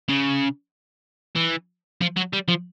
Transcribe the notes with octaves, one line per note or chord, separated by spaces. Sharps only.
C#3
E3
F3
F#3
G3
F3